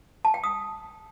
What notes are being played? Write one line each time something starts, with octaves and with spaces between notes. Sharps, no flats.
A5
G5
D#6